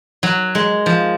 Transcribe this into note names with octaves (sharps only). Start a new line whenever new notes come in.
F#3
G#3
F3